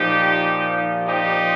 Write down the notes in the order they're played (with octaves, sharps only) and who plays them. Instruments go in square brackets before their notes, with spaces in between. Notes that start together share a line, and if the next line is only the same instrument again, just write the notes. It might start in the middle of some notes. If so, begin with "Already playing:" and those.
Already playing: [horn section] A#2 F3 D#4 G4
D#4 G4